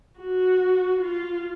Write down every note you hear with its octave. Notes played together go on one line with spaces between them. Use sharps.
F#4
F4